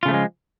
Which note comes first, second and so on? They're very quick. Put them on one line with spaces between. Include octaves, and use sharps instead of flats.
F4 C#3 A3 F3 G#3